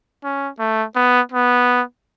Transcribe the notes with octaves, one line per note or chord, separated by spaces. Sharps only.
C#4
A3
B3
B3